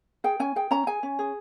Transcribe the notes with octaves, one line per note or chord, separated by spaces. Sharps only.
G#4 G5
C#4 G#5
G#4 G5
C#4 A#5
G#4 G#5
C#4
G#4